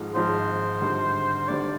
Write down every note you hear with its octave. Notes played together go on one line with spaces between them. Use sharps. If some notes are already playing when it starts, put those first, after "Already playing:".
Already playing: G#1 G#2 F3 G#3
G#1 G#2 F3 G#3 C5
G#1 G2 D3
G#1 G2 D3 D5